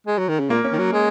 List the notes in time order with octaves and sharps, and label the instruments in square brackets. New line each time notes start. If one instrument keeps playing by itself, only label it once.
[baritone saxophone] G#3
F#3
D#3
C#3
[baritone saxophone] A#2 [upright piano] A#3
[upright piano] C#4
[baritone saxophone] D#3
F#3
G#3